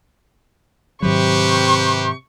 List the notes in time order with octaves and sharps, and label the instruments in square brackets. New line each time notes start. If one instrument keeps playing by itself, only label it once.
[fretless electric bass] G#2 D#3 F#3 [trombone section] C3 [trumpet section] G4 B4 C5 [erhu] C#6